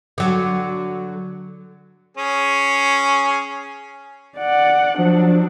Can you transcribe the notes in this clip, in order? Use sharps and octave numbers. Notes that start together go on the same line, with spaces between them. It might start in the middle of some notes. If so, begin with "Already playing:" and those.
D3 F#3
C#4 G#4
D5 F#5
F3 F#3 D4